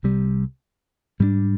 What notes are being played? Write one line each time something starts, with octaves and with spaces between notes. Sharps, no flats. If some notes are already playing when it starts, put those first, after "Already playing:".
C2 C3 G3
G#2 G3 A#3 D4